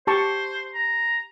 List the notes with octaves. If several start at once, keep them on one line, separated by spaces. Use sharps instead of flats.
G4 C5 A5 C#6
A#5